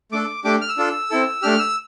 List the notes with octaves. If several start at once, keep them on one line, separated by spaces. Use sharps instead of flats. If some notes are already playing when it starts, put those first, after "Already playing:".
A3 D4 A4 D6
A3 D4 G4 D6
F6
E6
D4 F4 A4
C4 E4 A4
A3 D4 G4 F6
E6